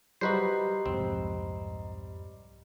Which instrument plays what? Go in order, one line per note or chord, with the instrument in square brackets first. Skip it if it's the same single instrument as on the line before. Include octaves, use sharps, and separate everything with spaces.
[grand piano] G3 [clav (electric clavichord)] F#4 B4 C5 [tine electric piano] D#5 A#5 C7
[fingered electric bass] C2 F2 G#2 [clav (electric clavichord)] C4